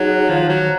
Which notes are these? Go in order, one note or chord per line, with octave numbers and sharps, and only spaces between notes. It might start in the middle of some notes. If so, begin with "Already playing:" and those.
Already playing: F#3 D#4 G#4 C#5
D#3 F3
F#3